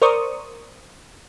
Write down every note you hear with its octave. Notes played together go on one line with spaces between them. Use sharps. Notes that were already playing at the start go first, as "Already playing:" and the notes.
A#4 C5 D5 C#6 D#6